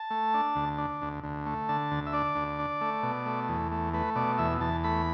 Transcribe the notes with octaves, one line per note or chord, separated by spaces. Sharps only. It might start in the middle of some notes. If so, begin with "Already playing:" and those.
Already playing: A5
A3
D4
D2
D4
D2
D2
A3
D3 A5
D2
E5
D4 D5
D2
D4
A3
B2
A3
E2
A3
A3 B4
B2 D5
E2 E5
E2 A5
A3 B5